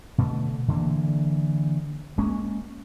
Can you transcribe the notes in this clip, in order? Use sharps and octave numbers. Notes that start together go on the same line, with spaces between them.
B2 D3 A3
D3 E3 A#3
G#3 A#3 C#4